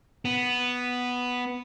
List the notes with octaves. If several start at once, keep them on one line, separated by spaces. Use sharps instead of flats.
B3